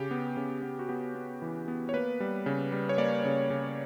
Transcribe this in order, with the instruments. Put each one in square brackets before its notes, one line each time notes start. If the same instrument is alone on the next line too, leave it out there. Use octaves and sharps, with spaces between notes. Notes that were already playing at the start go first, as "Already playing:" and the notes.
Already playing: [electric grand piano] C#3 G4
B3
C#3
B3
F#4
B3 G4
B3
E3
B3
C#5
A#3 B4
G3
C#3
G3
C#5
A#3 D5
C#3
C#3